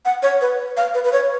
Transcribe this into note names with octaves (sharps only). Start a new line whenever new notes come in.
F#5
C#5
B4
F5
B4
B4
C#5